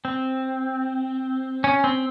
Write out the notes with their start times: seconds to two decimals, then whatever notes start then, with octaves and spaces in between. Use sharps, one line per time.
0.05 C4
1.64 C#4
1.84 C4